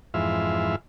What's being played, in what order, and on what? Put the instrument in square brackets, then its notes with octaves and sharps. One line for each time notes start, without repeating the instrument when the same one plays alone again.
[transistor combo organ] F2 G#2 E3 E5 F5